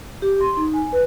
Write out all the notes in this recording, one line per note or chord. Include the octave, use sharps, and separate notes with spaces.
G4
C6
D#4
G#5
B4